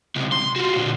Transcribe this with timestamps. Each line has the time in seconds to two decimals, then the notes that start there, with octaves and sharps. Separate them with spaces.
0.16 C#2 C3
0.32 C6
0.56 F4 F#4
0.76 A#2 D3